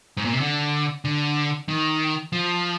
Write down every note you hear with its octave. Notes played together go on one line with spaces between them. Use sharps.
G#2
A#2
C3
D3
D3
D#3
F3